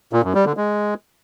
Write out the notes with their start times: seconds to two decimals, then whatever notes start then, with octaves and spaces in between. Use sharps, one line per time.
0.13 A#2
0.24 F#2
0.35 G3
0.46 D3
0.57 G#3